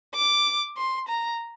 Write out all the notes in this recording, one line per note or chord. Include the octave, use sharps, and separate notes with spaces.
D6
C6
A#5